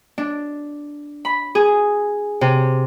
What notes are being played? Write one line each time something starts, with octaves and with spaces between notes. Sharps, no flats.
D4
B5
G#4
C3